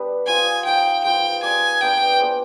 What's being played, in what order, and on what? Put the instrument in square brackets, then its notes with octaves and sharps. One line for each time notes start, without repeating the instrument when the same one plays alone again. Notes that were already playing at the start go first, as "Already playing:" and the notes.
Already playing: [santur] G3 B3 D4 G4 B4
[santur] C4 F4 C5 D#5 [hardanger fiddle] G#5
[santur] D#4 G4 C5 F5 [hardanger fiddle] G5
[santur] G#3 C4 F4 B4 [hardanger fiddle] G5
[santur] D#4 G4 D5 [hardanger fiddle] G#5
[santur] B3 D4 G#4 [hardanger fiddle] G5
[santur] B3 D4 G#4 C5